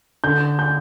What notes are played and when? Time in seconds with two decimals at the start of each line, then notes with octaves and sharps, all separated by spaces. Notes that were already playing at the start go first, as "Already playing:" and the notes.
0.24 D3 G6
0.59 G6